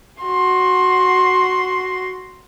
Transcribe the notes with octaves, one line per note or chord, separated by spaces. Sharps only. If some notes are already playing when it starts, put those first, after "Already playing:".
F#4 C6